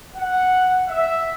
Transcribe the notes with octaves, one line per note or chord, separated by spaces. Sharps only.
F#5
E5